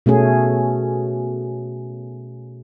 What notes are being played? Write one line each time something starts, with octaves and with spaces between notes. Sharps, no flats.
B2 A3 C#4 G#4